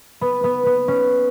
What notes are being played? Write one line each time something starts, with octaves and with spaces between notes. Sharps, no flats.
B3
B3
B3
C#4